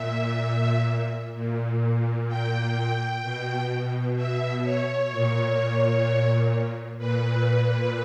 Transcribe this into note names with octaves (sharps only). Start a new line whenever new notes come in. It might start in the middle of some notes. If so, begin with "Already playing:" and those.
Already playing: A#2 E5
A#2
G5
B2
E5
C#5
A#2
A#2 B4